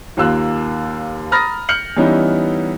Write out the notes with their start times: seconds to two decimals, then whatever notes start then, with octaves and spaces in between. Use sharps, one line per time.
0.17 D#2 A#3 F4 E6 F#6
1.31 A#5 B5 D#6 F6 A6 A#6
1.69 F6 G6 C#7 F#7
1.96 E3 G3 B3 C#4 D#4 E4